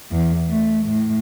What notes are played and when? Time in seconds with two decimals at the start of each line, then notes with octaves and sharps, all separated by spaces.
0.12 E2
0.48 A3
0.86 A2